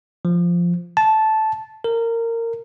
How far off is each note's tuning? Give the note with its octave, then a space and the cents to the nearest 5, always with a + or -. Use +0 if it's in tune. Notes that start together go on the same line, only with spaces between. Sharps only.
F3 -5
A5 -10
A#4 -20